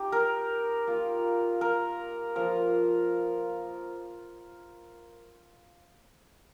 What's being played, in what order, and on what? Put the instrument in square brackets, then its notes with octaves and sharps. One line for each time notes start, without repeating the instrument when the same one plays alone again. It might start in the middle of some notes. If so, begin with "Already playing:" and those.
Already playing: [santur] D#4 G4
A#4
A#3 F4
A#4
F3 A#3 F4 A#4